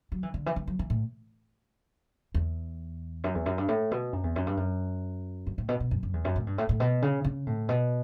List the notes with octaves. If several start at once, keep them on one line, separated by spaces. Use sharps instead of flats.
F#3
E3
D3
E3
E3
F#3
E3
A2
E2
F#2
E2
F#2
G2
A2
B2
F#2
E2
F#2
G2
F#2
G2
A2
B2
B2
F#2
F#2
E2
F#2
A2
G2
A2
A2
B2
C#3
C#3
A2
B2